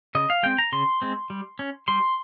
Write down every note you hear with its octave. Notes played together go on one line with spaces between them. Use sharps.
C#3 D#5
F5
G#3 C4 G5
A#5
C#3 C6
G#3 C4
G3
C#4
G3 C6